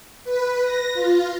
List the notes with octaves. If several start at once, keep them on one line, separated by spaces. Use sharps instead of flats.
B4
A#6
F4